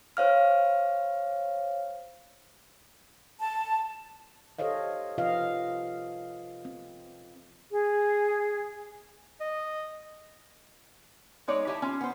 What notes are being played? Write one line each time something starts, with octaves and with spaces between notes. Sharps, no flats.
C5 C#5 F5 F6
A5
G4 A4 C5 C#5 D#5 F5
C3 F3 F4 B4 D#5 F5
C4
G#4
D#5
G#3 D#4 C#5 D5
E4 G4 E5 G#5 A5
C#4 F4
B3 C5